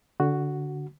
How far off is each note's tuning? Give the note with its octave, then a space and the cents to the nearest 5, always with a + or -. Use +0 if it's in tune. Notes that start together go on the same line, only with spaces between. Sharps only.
D3 -15 F#4 +0